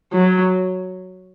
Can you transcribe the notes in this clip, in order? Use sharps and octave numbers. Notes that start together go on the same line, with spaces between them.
F#3